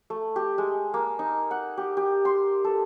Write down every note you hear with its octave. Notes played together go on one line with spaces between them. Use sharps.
A3
G4
G#3
A#3
D#4
F#5
G4
G4
C6
A4